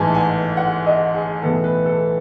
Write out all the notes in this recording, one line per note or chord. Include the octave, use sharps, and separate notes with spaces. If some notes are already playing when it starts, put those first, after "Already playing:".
Already playing: A1 G#2 E3 G#5 A5
G#5
F#5
D#5
G#4
B1 A2 E3 B3 A4
B4
A4